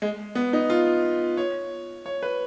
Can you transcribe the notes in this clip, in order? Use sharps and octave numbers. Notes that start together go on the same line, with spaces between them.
G#3
B3
D#4
F4
C#5
C#5
B4